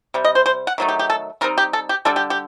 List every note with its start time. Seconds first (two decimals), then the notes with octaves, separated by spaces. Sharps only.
0.14 C3 G3
0.25 D#5
0.35 C5
0.46 C5
0.67 F#5
0.78 D#3 F#3 A3 D#4
0.89 G4
0.99 G4
1.10 A4
1.41 G3 C4 D#4 A#4
1.58 G4
1.73 A4
1.89 G4
2.05 D3 G3 D4 A4
2.16 G4
2.30 G4